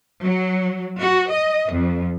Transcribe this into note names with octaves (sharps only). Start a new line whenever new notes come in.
F#3
F#4
D#5
F2